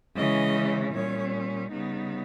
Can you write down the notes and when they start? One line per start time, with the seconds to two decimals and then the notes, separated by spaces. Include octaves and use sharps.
0.16 C#3 E3 G#3 C#4 D#5
0.93 A#2 G3 C#4 C#5
1.71 C#3 G3 B3 D#4